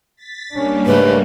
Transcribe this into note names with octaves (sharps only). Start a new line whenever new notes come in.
A6 B6
G3 A#3 C#4 D4
G#2 C#3 A3 B4